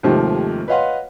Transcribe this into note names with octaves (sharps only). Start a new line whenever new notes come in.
D#2 G#2 C3 D#3 F3 A3
B4 C#5 D#5 F5 F#5 C6